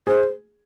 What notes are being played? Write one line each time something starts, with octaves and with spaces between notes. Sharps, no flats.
G#4 C5